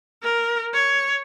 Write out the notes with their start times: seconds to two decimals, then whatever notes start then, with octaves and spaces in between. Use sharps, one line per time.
0.22 A#4
0.74 C#5